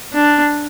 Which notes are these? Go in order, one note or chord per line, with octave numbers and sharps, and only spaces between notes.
D4